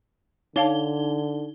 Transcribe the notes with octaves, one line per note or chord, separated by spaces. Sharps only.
D3 D#4 C#5 F5 A5 G7